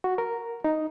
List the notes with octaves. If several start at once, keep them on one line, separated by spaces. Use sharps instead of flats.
F#4
A#4
D#4